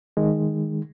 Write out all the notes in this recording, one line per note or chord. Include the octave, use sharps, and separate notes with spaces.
D#3 G#3